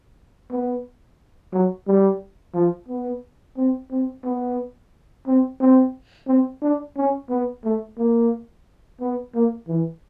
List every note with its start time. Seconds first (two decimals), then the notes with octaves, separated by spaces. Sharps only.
0.51 B3
1.53 F#3
1.87 G3
2.54 F3
2.88 B3
3.57 C4
3.91 C4
4.24 B3
5.27 C4
5.61 C4
6.28 C4
6.62 D4
6.97 C#4
7.30 B3
7.65 A3
7.98 A#3
9.01 B3
9.35 A#3
9.68 E3